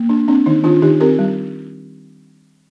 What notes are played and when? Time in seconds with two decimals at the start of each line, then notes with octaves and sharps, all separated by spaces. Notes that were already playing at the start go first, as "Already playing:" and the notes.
Already playing: A#3
0.09 D4
0.28 C4 D4
0.46 D#3 D#4
0.64 D#3 D4 F4
0.82 D#3 D#4 G4
1.00 C4 G4 A#4
1.19 G3